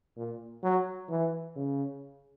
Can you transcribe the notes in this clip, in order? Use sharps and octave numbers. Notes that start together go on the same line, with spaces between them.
A#2
F#3
E3
C#3